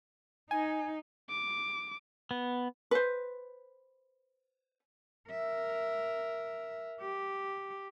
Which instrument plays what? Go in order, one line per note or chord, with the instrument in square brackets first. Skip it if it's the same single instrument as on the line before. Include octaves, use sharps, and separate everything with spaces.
[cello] D#4 [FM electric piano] G#5
[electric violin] D6
[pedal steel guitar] B3
[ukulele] B4 C5
[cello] A#4 E5
G4